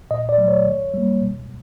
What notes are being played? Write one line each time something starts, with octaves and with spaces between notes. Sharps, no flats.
A#2 D#5
D5
F#3 A3
C#5
D#3
G3 A#3
B2